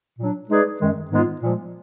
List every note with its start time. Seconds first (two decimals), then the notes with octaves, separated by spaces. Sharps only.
0.19 A#2 F#3 D4
0.50 G#3 D#4 G#4 B4 D5
0.80 F#2 D#3 G#3
1.11 G#2 D#3 G#3 B3 F4
1.42 A#2 F3 G#3